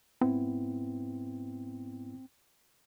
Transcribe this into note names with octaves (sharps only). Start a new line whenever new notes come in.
G#2 B3 C4 E4